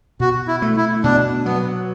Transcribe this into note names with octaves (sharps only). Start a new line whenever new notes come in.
B2 F#4
E4
A3
E4
B2 D4
F#3 B3